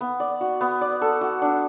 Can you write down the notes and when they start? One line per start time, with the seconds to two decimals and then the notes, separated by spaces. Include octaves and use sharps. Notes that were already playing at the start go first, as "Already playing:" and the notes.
0.01 B3
0.20 D5
0.41 F#4
0.61 B3
0.81 D5
1.02 A4
1.21 F#4
1.42 D4